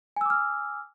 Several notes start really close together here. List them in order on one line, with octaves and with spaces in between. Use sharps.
G#5 E6 D6 F6